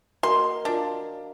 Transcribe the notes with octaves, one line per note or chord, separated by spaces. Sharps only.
F#4 A#4 D#5 C6
D4 F4 A#4